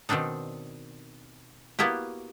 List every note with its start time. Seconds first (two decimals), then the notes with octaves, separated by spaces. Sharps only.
0.09 B2 D#3 C4 D4 D#4
1.79 A#3 B3 E4 F#4 G4